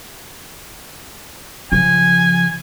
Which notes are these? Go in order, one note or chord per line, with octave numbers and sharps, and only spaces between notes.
C#3 F3 G#5